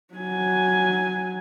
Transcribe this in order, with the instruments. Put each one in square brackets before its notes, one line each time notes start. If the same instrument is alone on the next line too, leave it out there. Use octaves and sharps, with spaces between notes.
[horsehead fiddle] F#3 G#5